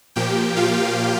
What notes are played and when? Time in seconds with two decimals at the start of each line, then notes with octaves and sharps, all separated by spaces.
0.16 A#2 F3 A#3 G4 G5
0.56 F4 F5